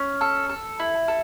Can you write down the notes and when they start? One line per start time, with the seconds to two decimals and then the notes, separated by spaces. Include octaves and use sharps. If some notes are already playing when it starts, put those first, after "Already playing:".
Already playing: C#4
0.21 A4
0.49 A4
0.80 E4
1.08 A4